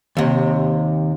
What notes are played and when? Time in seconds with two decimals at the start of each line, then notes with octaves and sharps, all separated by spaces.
0.17 D#2 C3